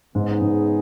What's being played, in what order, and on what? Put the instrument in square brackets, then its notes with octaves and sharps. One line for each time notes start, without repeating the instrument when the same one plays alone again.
[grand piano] G#2 [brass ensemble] C#3 B3 D#4 G#4
[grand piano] G#2